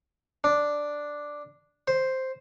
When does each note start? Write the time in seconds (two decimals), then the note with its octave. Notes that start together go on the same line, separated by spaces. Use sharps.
0.44 D4
1.88 C5